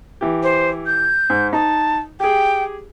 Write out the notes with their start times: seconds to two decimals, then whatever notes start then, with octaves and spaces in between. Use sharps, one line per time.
0.21 E3 G4
0.43 C5
0.86 G6
1.30 G#2
1.53 D#4 A5
2.20 G4 G#4 G5